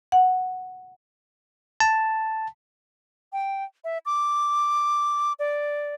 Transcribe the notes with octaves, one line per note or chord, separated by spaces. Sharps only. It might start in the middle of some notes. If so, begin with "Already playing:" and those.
F#5
A5
G5
E5
D6
D5